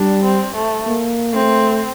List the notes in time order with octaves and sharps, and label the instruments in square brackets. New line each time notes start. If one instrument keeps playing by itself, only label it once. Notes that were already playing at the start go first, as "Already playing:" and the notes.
Already playing: [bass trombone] G3 [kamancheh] D4
[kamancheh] C4
A3
[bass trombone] A#3
[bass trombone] A3 [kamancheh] C4